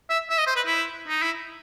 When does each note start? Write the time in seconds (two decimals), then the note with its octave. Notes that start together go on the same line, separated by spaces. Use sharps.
0.10 E5
0.30 E5
0.38 D#5
0.47 C5
0.56 B4
0.66 E4
1.08 D#4
1.22 E4